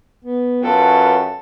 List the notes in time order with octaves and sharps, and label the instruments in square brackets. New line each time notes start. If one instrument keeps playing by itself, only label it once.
[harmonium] B3
[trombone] F#2 [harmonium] F4 B4 G5 [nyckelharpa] A4